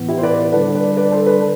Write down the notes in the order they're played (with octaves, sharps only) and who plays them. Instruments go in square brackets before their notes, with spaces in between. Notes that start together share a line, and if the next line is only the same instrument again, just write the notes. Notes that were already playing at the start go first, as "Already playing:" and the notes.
Already playing: [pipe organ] A2 E3 B3
[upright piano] E4 G4
C5
B4 D5
[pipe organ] D3 G3 D4 [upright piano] B4 D5
[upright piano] B4 D5
B4 D5
A4 C5
B4 D5